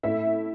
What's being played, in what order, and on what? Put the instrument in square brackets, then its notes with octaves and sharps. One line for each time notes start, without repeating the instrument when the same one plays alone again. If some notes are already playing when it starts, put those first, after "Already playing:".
[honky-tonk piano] A2 A3 E4 E5